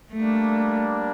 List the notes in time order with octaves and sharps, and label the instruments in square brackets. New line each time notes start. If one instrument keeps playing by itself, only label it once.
[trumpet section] G3 A#3 D4 [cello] A3